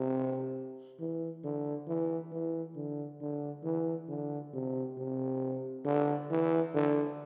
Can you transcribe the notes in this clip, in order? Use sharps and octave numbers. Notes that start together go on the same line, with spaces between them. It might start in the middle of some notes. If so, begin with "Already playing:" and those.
Already playing: C3
E3
D3
E3
E3
D3
D3
E3
D3
C3
C3
D3
E3
D3